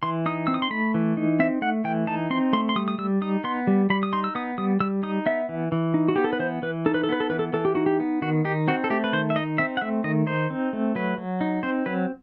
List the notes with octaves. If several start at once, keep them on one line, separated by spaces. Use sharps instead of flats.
E3 C6
D#4 D#6
C4 E6
D#6
C6
A3 B5
E3
D#4
C4 E5
A3 F#5
E3 G5
D#4 A5
C4 C6
A3 C6
C6
G3 D#6
D#6
G3 E6
D#4 D#6
B3 C6
G3
G3 B5
D#6
D#4 C6
E6
B3 D#6
G3 D#6
G3 E6
D#4 D#6
B3 E5
E3
E3
D#4
F#4
B3 G4
A4
B4
E3 C5
E3 B4
D#4 A4
B4
A4
B3 B4
A4
E3 B4
A4
E3 A4
G4
D#4 F#4
G4
B3
D#3 F#4
D#4 G4
C4 F#4
A4
A3 G4
B4
D#3 C5
E5
D#4 D#5
C4 E5
F#5
A3 E5
D#3 D#5
D#4 C5
C4
A3
F#3 B4
F#3
D#4
C4 C5
F#3 B4